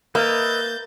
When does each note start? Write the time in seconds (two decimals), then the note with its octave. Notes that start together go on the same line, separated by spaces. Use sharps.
0.15 A#3 B4 D#5 E5 G6 A6